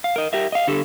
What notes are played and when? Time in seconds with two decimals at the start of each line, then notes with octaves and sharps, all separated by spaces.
0.04 F5
0.16 A#4 D#5
0.33 G4 A#4 E5
0.52 D#5 F5
0.68 D3 G4 A4